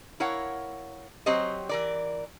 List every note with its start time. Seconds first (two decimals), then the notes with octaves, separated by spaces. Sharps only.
0.20 E4 A#4 C#5 F5 F#5
1.26 F#3 C4 G4 C5 C#5 D#5
1.69 E3 A#4 D5